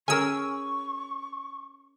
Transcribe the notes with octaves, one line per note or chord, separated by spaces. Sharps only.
C#4 G#4 A#4 G#5 C#6 E6